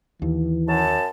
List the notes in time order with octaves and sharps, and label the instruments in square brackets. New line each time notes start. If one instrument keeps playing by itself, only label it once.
[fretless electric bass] D#2 [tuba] E3
[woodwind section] F#2 A5